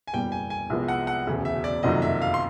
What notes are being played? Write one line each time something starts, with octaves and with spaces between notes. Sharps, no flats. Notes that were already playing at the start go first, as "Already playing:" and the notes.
G#5
F#1 E2 B2 G3 G5
G#5
G#5
C2 C3 F3 G#3 B3
F#5
F#5
E1 D2 C#3
E5
D5
F#1 F2 C3 D#3 F#3 D#5
E5
F5
C6